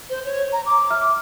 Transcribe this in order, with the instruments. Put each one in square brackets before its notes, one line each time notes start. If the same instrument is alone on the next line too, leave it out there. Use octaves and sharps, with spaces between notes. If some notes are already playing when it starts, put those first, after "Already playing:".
[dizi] C5
C#5
A#5
D6
[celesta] E5 F6